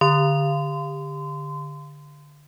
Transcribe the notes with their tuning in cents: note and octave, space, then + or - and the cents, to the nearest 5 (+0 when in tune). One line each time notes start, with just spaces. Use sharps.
D3 +0 C6 -30